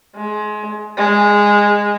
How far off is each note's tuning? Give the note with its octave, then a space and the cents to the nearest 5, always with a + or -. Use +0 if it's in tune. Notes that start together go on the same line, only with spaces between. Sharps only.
G#3 +25
G#3 -15